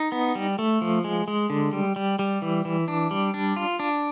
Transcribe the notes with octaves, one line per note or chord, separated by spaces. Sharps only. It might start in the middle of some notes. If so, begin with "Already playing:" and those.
Already playing: D#4
B3
G3
A3
F3
G#3
G#3
D3
G3
G3
G3
E3
E3
D4
G3
D4
F4
D4